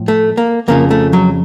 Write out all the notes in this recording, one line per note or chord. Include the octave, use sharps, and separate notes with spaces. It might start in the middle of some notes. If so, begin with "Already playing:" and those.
Already playing: A2 F3
A3
A#3
F2 C#3 F3 A#3
A3
F#3